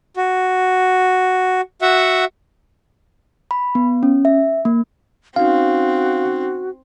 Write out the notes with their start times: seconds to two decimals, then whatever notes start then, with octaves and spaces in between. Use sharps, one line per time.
0.17 F#4
1.82 F#4 E5 F#5
3.51 B5
3.75 B3
4.03 C#4
4.25 E5
4.65 A#3
5.36 C4 C#4 D#4 F#4 F5